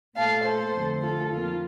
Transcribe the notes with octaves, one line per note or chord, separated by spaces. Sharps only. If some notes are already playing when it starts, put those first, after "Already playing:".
A#2 A3 F5 A5
A4 C5
F2 D3 A3
F4 A4
F2 D#3 A#3 F4